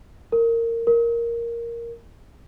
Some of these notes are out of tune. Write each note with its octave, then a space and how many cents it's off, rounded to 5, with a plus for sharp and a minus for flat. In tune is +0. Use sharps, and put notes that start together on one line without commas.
A#4 -20
A#4 +0